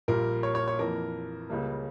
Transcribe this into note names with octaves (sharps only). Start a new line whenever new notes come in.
A#1 A#2 G3 A#4
C#5
C#5
C#5
F2 E3 A#3 A#4
C#2 C#3 G3 A#3